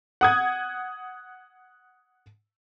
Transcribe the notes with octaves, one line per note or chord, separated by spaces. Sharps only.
F#5 D#6 G#6